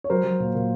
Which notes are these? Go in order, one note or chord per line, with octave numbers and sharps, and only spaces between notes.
C#5
F#3 A#4 C5
F#3
A#2
A#2